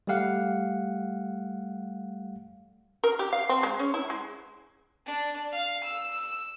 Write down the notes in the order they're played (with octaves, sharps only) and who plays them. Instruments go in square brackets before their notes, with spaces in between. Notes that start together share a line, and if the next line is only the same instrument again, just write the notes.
[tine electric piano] G3 A3 G4 F5 F#5
[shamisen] A#4
G4
F5
C4
G#3
C#4
E4
G#3
[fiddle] D4
F5
E6